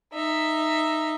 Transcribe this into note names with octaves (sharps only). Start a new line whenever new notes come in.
D#4 E5